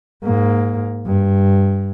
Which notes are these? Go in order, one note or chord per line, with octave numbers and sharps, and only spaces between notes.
G#2 A#3
G2